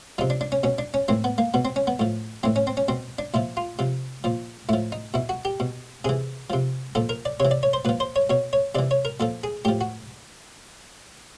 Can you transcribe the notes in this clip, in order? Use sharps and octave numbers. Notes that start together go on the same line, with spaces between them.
C3 F3 D#4
D4
D4
C#4
B2 C#4
D4
C#4
A2 E3 C4
B3
A#3
B2 B3
C4
C#4
B3
A2 F3
A2 E3 C4
C#4
C4
C#4
B2 C4
D4
A#2 F3 E4
F4
C3 F3
A#2 F3
A2 F3 E4
D#4
B2 E4
F#4
G4
B2
C3 E3 G#4
C3 F3
A#2 F3 A4
A#4
D5
C3 E3 C#5
D5
C#5
C5
A#2 F3 B4
C5
C#5
B2 C#5
C#5
C3 E3 D5
C#5
A#4
A#2 F3 A4
G#4
A2 F3 G4
F#4